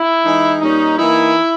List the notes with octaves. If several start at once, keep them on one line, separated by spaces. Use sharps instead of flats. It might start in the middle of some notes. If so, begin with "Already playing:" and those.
Already playing: E4
E3 G#3 D#4
A#2 G3 C#4 D#4
E3 A#3 D#4 E4